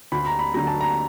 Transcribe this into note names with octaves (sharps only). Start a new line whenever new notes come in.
D2 B5
A#5
B5
D3 F#3 A#5
A5
A#5